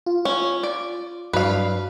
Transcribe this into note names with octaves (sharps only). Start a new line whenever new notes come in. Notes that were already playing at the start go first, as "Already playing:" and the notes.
F4
C#4
D5
G2 F#3 D4 B4 F5